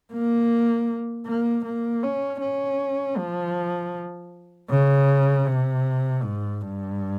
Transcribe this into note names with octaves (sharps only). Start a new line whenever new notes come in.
A#3
A#3
A#3
C#4
C#4
F3
C#3
C3
G#2
G2